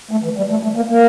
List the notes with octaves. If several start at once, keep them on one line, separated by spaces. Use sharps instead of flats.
A3
E3
G3
A3
A3
A#3
A#3